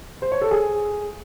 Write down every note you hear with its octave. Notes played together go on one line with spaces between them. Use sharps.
C5
C#5
A4
G#4